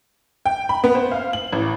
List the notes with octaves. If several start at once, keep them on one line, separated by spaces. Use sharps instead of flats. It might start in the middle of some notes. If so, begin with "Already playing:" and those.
G5
B5
B3
C5
F5
F#7
A1